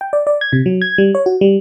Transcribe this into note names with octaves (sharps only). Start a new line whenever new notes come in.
G5
D5
D5
G#6
C3
F#3
G#6
G3
C#5
F#4
G3